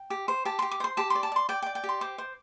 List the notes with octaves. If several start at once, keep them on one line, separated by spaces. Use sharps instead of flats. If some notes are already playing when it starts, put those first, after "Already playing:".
Already playing: G5
G4
C5
G4 A5
G4 C6
D6
C5 C6
G4 A5
D5 C6
A5
D5 C6
D5 G5
G5
D5
G5
G4
C6
C5 D6
C5